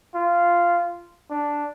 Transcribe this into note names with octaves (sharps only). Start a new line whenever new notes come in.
F4
D4